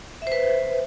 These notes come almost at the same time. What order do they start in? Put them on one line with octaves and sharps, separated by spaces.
E5 C5 B4